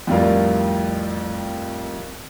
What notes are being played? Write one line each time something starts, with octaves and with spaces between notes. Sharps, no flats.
F2 A2 G3 F4 A#4